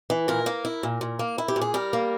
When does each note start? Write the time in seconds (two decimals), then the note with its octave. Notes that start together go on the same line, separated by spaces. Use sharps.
0.10 E3
0.28 A#2 A#4
0.46 A#3
0.65 E4
0.83 A#2
1.01 A#2
1.19 A#3
1.38 E4
1.48 G4
1.56 A#2
1.61 G#4
1.74 G3 A#4
1.93 A#3